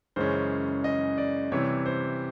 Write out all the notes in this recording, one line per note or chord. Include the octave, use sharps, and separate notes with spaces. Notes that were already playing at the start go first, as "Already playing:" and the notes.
F#2 C#3 E3 G#3 C#4 C5
D#5
D5
C3 E3 G3 C#5
C5